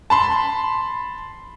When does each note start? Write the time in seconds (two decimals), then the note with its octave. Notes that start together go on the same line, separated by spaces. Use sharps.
0.10 A5 B5 C6